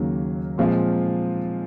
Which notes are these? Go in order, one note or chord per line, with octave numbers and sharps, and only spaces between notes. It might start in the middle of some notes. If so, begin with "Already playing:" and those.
Already playing: D#2 C#3 F#3 A#3
A#2 F3 G#3 C4 F4